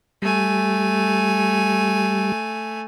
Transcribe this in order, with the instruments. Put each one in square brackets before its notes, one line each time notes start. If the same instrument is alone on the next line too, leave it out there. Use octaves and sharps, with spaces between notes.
[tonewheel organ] G3 [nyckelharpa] A3 G#5